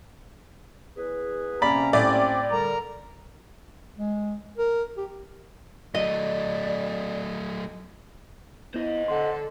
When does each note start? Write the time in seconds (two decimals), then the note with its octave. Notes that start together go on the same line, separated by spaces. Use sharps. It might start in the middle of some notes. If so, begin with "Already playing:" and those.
0.97 E2 G#4 B4
1.62 C3 G3 A#3 C#4 D5 A#5 B5
1.93 A2 C4 D5
2.52 D3 G3 A#4 A#5
3.98 G#3
4.58 A#4
4.97 G4
5.95 F#3 A3 D5 D#5
8.74 B3 E4 C5 D#5
9.08 D3 A4 F#5 C6